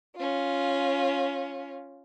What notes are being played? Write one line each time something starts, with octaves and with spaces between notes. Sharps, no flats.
C#4 F4